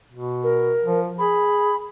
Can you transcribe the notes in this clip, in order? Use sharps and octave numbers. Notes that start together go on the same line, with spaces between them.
B2
A#4
F3
G#4 B5